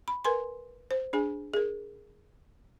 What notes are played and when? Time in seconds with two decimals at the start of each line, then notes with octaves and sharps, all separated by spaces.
0.08 B5
0.25 A#4 B4 G#5 C6
0.91 C5
1.13 D4 G#4 G#5
1.54 G#4 A#4